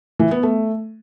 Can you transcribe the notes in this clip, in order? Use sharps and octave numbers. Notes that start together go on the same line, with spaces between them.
E3
B3
A3